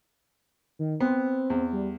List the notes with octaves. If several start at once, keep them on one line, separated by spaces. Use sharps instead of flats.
D#3
B3 C4
E2
G3